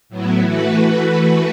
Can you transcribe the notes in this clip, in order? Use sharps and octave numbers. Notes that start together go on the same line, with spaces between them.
A2 F#3 B3 E4
E3 A3 F#4 B4